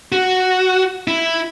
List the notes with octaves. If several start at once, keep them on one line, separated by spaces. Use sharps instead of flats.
F#4
E4